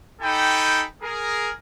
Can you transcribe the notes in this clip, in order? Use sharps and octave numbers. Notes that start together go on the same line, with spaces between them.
D#4 G4 A4 G5 G#5 B5
G#4 A#4